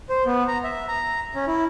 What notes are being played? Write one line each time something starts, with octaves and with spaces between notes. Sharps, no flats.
C5
B3
A#5
E5
A#5
C#4
E4